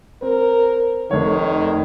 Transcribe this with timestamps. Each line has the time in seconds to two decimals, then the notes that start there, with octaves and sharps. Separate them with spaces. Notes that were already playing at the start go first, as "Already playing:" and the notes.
0.22 C4 A#4
1.11 F1 D#3 A3 C#5